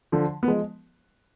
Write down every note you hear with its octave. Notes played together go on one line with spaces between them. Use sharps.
D3 F3
B3
F3 G#3